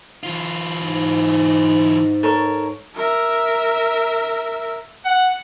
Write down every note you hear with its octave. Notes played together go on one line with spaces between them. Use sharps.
E3 F4
G#2
A4 A#4 C#5
A#4 E5
F#5